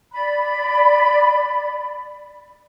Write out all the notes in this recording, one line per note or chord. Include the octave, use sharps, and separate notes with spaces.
D5 B5